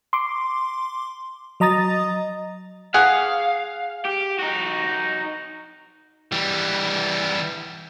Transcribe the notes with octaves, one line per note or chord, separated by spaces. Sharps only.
C6 D6
F#3 D#5 A#5 D#6 A6
G#4 F5 F#5
G4
D#4 F#4
E3 G3